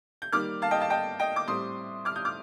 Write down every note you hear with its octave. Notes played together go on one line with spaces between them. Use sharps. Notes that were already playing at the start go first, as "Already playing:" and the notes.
G6
D#3 G3 A#3 D6 F6
F5 A5
D#5 G5
F5 A5
D#5 G5
D#5 G5
D6
A2 G3 C4 C6 D#6
D6 F6
D#6 G6
D6 F6